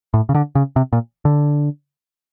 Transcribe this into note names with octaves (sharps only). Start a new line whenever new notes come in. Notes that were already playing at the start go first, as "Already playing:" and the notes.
A2
C#3
D3
C#3
C3
A#2
D3